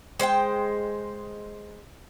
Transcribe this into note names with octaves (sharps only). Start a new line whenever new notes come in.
G#3 C5 F5 G5